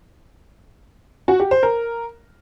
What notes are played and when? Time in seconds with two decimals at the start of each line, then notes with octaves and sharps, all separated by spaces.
1.28 F#4
1.40 G4
1.51 C5
1.63 A#4